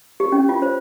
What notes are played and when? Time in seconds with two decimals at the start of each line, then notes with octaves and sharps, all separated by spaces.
0.20 G4
0.32 C#4
0.49 F4
0.62 C5